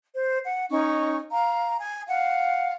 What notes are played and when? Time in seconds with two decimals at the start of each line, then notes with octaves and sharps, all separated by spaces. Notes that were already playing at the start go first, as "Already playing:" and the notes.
0.15 C5
0.46 F#5
0.71 C#4 D#4 C#6
1.31 F5 A#5
1.79 G#5
2.08 F5 F#5